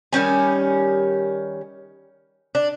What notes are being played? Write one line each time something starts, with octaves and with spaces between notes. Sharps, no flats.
D#3 G3 C#4 G#5
D4